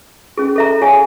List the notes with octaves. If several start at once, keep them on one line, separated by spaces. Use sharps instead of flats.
C#4 G#4
A4 E5 A#5
G#4 C#5 F5 G#5